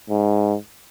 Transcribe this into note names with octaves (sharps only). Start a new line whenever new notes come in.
G#2